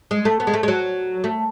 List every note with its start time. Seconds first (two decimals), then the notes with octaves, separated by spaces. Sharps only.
0.11 G#3
0.25 A3
0.40 B3
0.47 G#3
0.54 A3
0.63 G#3
0.68 F#3
1.24 A3